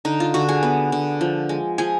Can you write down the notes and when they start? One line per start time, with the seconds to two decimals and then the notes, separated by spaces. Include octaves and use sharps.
0.05 D3 D#4
0.20 F4
0.34 D3 F#4
0.49 G#4
0.63 B3
0.92 D3
1.21 F3
1.49 G#3
1.78 F3 G#4